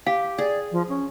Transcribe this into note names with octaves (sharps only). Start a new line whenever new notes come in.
G4 F5
G#4 D5
F3
C#4